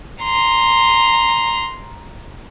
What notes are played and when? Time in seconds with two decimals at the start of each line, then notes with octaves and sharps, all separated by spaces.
0.23 A#5 C6